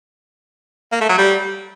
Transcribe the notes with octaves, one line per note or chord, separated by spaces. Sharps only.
A#3
A3
F#3
G3